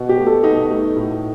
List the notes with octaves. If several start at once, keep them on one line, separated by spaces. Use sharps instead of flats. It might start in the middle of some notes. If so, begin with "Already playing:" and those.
Already playing: B2
G4
A3
A4
B2 D#4
A3
A2